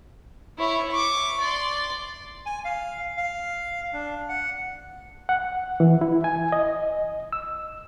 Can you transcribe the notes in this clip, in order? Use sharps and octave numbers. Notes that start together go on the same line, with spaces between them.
E4 C#5
C#6 D6
D5 C6
G#5
F5
F5
D4
F#5
F#5
E3
E4
G#5
D#5
E6